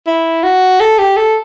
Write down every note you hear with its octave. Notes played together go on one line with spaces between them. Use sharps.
E4
F#4
A4
G4
A4